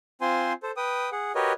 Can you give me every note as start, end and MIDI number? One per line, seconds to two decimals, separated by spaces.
0.21 0.53 60
0.21 0.53 65
0.21 0.53 72
0.21 0.53 80
0.21 0.53 84
0.63 0.71 69
0.63 0.71 72
0.77 1.09 71
0.77 1.09 79
0.77 1.09 87
1.12 1.32 68
1.12 1.32 78
1.35 1.53 66
1.35 1.53 67
1.35 1.53 70
1.35 1.53 71
1.35 1.53 73
1.35 1.53 75